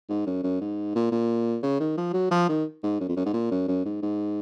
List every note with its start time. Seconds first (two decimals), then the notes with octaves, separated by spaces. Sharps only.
0.09 G#2
0.26 F#2
0.43 F#2
0.60 G#2
0.95 A#2
1.11 A#2
1.63 C#3
1.80 D#3
1.97 F3
2.13 F#3
2.31 F3
2.48 D#3
2.83 G#2
3.00 F#2
3.08 F2
3.16 F#2
3.26 G#2
3.33 A#2
3.51 F#2
3.68 F#2
3.85 G#2
4.02 G#2